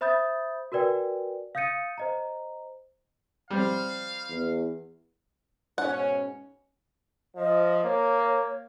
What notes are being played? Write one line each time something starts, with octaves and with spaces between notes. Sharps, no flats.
C5 E5 B5 D#6 G6 A6
F#4 A#4 B4 D5 G5 G#5
F5 D#6 G6 A6 C#7 D#7
C5 D#5 A#5
G3 C4 F5
E2
G#2 B2 C#4 F#5
F3 D#5
A#3 C#5